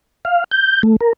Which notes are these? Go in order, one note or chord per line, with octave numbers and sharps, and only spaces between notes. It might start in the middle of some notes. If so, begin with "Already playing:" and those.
F5
G6
A3
A#4